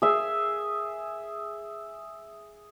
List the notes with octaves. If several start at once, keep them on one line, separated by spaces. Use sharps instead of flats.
G#4 E5